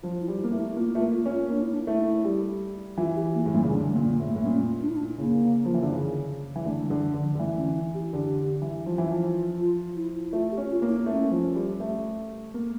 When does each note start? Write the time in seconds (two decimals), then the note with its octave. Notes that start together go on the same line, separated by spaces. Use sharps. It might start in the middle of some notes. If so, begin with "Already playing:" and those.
0.03 F3 F4
0.21 E4
0.28 G3
0.40 E4
0.44 A#3
0.52 A3
0.58 E4
0.76 A#3 F4
0.95 A3 F4
1.01 A#3
1.14 F4
1.25 C#4
1.32 F4
1.50 A#3 D4
1.62 E4
1.74 D4
1.87 A3 E4
2.24 G3
2.97 E3 F4
3.16 G4
3.34 A#3
3.46 A2
3.53 A#2 G3
3.62 C#3
3.71 D3 G3
3.90 A3
3.96 A#2
4.08 A#3
4.20 A2
4.26 A#3
4.35 A2
4.44 A#2 C#4
4.81 D4
4.89 E4
4.96 D4
5.18 C#3 A#3
5.65 F3
5.74 E3
5.82 D3
5.92 C#3
6.56 E3
6.65 D3 A3
6.84 G3
6.90 D3
7.03 E3
7.14 D3
7.21 F3
7.35 D3
7.39 E3 A3
7.58 C#4
7.76 E4
7.94 G4
8.12 D3 G4
8.62 E3
8.86 F3
8.98 E3
9.11 F3
9.59 F4
9.96 E4
10.33 A3 F4
10.51 G4
10.57 C#4
10.70 F4
10.82 A#3
10.89 E4
11.06 A3 C#4
11.31 F3
11.55 G3
11.80 A3
12.54 A3 A#3